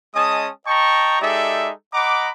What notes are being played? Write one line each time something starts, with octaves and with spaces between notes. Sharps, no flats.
G#3 C#4 D#5 A5 D#6
D#5 G5 A5 A#5 C#6
G#3 D#4 G4 A4 D5 E5
D#5 F#5 A#5 B5 D6